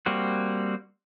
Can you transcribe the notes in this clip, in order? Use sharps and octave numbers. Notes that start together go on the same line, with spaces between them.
G3 A#3 C4 F#4